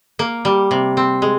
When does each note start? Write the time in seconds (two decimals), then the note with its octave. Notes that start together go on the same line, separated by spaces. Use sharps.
0.19 A#3
0.45 G3
0.71 C3
0.97 C4
1.22 G#3